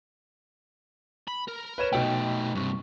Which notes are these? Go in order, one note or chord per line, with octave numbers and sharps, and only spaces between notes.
B5
A#4
B4 C#5 E7
B2 A3 D#4 G5
G2 C3 C#6